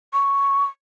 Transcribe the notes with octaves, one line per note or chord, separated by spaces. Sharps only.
C#6